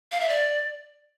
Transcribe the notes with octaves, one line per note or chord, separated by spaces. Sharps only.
F5
E5
D5